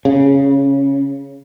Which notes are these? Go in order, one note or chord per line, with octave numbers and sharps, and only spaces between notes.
C#3